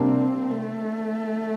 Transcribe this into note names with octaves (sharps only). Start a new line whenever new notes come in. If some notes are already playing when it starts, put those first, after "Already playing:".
Already playing: C3 G3 A#3 C4 D4
A3